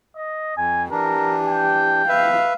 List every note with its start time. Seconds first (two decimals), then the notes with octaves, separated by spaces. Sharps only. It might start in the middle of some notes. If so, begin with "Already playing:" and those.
0.16 D#5
0.57 F2 G#5
0.91 E3 D4 G4 A#4
1.49 G5
2.09 B4 E5 F5